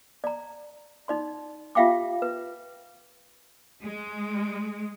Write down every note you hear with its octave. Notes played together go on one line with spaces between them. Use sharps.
D5 A#5
D#4 D5 C6
F4 G4 E5 F5 G5 D6
B4
G#3